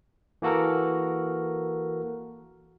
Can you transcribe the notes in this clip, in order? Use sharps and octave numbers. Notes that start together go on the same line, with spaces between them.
E3 A#3 F#4 A4 A#4